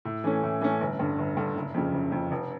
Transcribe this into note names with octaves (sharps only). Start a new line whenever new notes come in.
A2
E3 A3 C#4
A2
E3 A3 C#4
G1
G2 D3
G1
G2 D3
F#1
F2 C#3
F#1
F2 C#3
F1